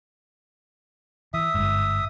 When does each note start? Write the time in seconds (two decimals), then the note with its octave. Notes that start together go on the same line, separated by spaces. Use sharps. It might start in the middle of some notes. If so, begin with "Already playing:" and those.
1.34 E3 E5 D#6
1.54 G1 G#2